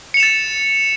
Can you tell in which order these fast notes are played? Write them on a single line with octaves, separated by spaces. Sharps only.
C#7 F7 E7 A6